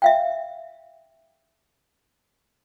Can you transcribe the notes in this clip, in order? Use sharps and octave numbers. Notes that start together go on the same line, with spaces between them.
E5 F5 G5